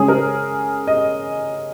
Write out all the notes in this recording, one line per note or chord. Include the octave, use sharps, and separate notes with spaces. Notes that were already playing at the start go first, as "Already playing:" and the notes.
Already playing: C#3 G#3 C#4 G#4
A#4
D#5